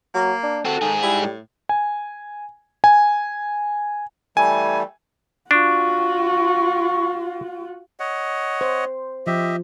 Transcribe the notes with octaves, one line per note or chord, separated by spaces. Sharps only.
F#3 A#3
D4
C4 F#4 A4
G#2 D#3 G#4
G3 E4
A2
G#5
G#5
E3 G3 A3 G#5
D4 F4 F#4 C#6
C#5 D#5 F#5
C5
F3 G4 D#5 E5